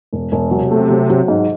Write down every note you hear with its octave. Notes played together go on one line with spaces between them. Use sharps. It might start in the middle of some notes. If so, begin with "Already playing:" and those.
E1
E1
C3 F#3
A3
F#3
F#3
G#2